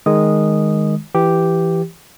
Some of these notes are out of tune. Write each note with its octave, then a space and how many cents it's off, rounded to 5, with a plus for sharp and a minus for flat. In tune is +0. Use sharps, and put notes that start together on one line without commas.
D#3 +0 G#3 +0 D#6 -10
E3 +15 G4 +0